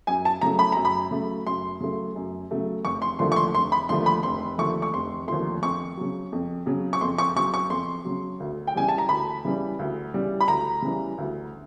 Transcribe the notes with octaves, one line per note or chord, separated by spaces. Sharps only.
F#2 G#5
A5
C#3 F#3 A3 A#5
B5
F#2 A#5
B5
C#3 F#3 A3
F#2 C6
C#3 F#3 A3
F#2
C#3 F#3 A3
F1 C#6
C6
D#2 D3 F3 A3 C6
C#6
C6
F1 C6
B5
D#2 D3 F3 A3 C6
B5
F1 C6
D#2 D3 F3 A3 C#6
C#6
F1 C6
D#2 D3 F3 A3 C6
F2 C#6
C#3 F#3
F2
C#3 F#3
C#6
F2 C6
C#6
C#3 F#3 C#6
C#6
F2 C6
C#3 F#3
D2
G5
C#3 E3 G3 G#5
A5
A#5
D2 B5
C#3 E3 G3
D2
C#3 E3 G3
B5
D2 A#5
C#3 E3 G3
D2